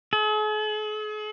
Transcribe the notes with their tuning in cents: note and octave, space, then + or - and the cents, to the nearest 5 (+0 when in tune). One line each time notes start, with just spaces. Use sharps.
G#4 +45